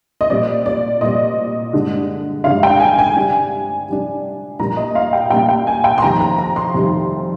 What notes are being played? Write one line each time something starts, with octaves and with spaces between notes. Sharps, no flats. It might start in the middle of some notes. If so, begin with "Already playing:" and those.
D#5
A#2 G3 C4 D5
D5
A#2 G3 C4 D#5
G2 D3 G#3 D4
G2 D3 G#3 D4 F5
G5
G#5
G#5
C3 G3 D4
C3 G3 D4
A#2 G3 A#3 D4 A#5
D#5
F5
G5
A#2 G3 A#3 D4 G5
G5
G#5
G5
C6
F2 C3 D#3 G3 A#5
A#5
A#5
C6
F2 C3 D#3 G3